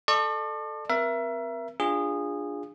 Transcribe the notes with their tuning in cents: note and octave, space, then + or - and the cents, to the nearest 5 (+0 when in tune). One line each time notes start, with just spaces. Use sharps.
A4 +0 D5 +40 C#6 -25
C4 -20 A#4 +30 E5 +30
D4 +0 F4 +0 G#4 -20